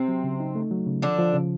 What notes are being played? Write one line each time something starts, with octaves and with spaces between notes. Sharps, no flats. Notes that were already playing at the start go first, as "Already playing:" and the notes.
Already playing: C3 C4
F#3
C#3
D#4
A3
F#3
C#3
D3 F3 D4
F3
C#3